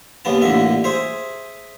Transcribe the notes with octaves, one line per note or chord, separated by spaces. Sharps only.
D#2 C#3 B3 A5
A1 A#2 D3 E5
G#4 C5 E5